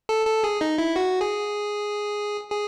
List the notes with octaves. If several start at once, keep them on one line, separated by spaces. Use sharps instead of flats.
A4
A4
G#4
D#4
E4
F#4
G#4
G#4